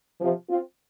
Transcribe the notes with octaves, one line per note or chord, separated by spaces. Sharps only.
C3 F3
C4 F4